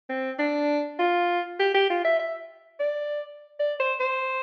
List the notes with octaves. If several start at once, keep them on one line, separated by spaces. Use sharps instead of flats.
C4
D4
F4
G4
G4
F4
E5
E5
D5
D5
C5
C5